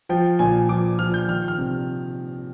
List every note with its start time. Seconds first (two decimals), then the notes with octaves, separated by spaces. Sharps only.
0.09 F3 G5
0.39 A#2 G#5
0.69 F3 D6
0.99 F3 F6
1.14 G6
1.28 D#3 F6
1.48 F6
1.58 C3